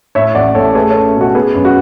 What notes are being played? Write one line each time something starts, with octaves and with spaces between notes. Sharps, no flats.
A2 C#5 E5
A1 D5 F#5
A1 A4 C#5
A3 G#4 B4
A4 C#5
C#4
B2
F#4 A4
B3 G#4
F#2
F#4